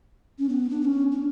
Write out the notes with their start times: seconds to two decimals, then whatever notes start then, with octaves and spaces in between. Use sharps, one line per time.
0.39 C#4
0.49 B3
0.70 D4
0.81 D4
0.85 C#4
1.12 D4